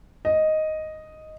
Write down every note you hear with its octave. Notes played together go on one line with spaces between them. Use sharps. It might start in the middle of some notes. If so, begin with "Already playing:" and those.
D#5